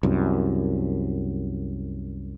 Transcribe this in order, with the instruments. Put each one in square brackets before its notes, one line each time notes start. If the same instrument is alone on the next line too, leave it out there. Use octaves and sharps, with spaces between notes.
[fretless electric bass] C2 F#2